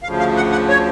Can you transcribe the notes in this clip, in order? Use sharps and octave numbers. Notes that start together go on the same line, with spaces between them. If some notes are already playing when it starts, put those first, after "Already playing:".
D2 C#3 F3 F5
F5
F#5
F#5
C#5